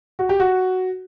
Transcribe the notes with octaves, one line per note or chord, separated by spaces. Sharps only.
F#4
G4
F#4